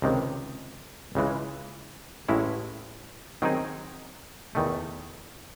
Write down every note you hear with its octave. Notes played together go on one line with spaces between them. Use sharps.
C#2 C3 D#3
C#2 C#3 E3 G#3
A1 A2 G#3 C#4 E4
D#3 F#3 C4 D#4 G#4
E2 D#3 A3